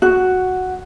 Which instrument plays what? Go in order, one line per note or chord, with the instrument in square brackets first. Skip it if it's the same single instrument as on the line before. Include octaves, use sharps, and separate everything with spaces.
[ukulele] F#4